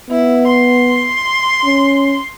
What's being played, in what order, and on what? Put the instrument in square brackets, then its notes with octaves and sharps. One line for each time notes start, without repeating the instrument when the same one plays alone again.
[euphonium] B3 [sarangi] E4
[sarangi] C6
[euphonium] C#4